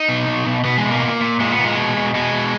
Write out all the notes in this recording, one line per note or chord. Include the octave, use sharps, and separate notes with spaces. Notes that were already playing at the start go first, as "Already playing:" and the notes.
Already playing: D#4
B2
B2
B2
B2 B3
G#3
B2
A#3
A#2
A#2
A#2 G#3
B3
A#2
G#3
B2
B2
B2 G#3
B2